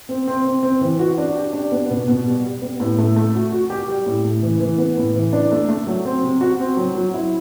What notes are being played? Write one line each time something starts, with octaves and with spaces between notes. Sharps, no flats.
C4
C4
C4
C4
E3
F#4
D4
G4
D4
B3
B2
B2
G3
G3
B3
A2
A3
A3
F#4
F#4
G4
G3
A2
A3
E3
E3
B3
A2
E3
D4
A3
A3
F#3
C4
C3
F#4
C4
F#3
F#3
E4